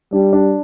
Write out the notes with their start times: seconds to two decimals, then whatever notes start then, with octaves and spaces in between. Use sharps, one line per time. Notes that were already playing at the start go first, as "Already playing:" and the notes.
0.13 G3 D4
0.33 D4